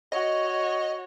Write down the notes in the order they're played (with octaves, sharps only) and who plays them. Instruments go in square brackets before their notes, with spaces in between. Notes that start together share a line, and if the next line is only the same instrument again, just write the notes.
[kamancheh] F#4 C#5 [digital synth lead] D#5